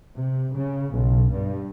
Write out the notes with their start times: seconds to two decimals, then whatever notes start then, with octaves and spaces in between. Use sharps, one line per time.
0.16 C3
0.54 C#3
0.91 B1
1.32 G2